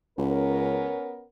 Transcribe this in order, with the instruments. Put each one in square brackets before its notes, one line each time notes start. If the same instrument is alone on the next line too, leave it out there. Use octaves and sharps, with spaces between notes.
[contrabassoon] C#2 [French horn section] B3 C#4 A#4